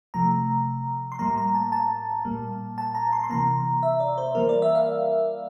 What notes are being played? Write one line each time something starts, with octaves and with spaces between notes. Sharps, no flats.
C3 F3 A3 A#5
C6
A2 G3 A#3 A#5
A#5
A5
A5
A#2 G3 A#3
A5
A#5
C6
C6
C3 E3 A#3 A#5
E5
D5
C5
E3 G3 A#3 A#4
D5
E5
F5